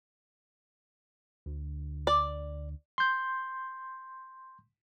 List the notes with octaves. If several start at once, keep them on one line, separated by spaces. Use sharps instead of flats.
D2
D5
C6 G6